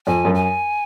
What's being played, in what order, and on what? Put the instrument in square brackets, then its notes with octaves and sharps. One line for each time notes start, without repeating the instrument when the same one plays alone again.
[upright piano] F2 [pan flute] G#5
[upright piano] F#2
[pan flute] G#5